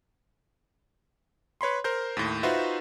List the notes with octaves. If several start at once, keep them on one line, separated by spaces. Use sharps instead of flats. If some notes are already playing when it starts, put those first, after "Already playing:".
B4 C#5 B5 C6
A#4 C5 G6
D#2 A2
D#4 F4 F#4 B4 C5 E5